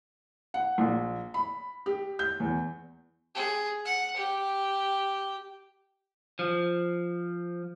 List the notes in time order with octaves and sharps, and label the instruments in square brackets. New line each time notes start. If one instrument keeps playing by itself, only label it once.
[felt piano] F#5
A#1
B5
G4
G6
E2
[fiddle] G#4
F#5
G4
[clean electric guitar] F3